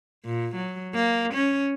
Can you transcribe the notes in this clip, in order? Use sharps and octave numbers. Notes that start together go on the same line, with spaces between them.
A#2
F#3
A#3
C#4